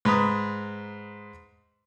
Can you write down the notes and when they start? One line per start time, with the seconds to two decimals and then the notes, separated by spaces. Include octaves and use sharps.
0.05 G#2 B4 A#5 D#6